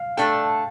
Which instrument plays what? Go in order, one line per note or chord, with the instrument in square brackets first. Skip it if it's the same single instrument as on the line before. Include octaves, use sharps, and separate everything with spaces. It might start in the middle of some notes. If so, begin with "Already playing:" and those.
Already playing: [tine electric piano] F5
[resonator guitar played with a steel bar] A3 D4 A4 [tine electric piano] G5